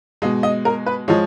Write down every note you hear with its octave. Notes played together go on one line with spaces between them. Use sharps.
B2 G#3 D#5
D#5
A#4
B4
F3 G#3 C#5